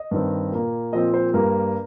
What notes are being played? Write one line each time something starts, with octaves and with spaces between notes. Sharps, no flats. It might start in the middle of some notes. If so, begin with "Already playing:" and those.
Already playing: D#5
G2 D#3 C4
A#2 A#3
A#2 F3 C4 D#5
C5
G2 G3 A#3 A#4